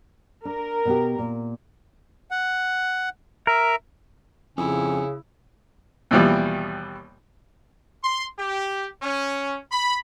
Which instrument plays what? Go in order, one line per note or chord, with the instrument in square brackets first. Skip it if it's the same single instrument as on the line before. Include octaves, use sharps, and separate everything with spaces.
[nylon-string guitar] D4 [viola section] A#4
[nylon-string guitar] B2 B3 G4
A#2
[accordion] F#5
[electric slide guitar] A#4 [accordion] E5
[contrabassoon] F2 [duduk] C#3 [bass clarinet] C#4 [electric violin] E4
[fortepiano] D#2 B2 E3 F3 G3
[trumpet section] C6
G4
C#4
B5